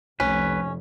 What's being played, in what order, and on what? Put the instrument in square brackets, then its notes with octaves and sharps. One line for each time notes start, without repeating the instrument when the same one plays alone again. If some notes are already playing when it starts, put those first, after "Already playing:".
[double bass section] F1 [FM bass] C2 [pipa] C#4 [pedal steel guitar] B4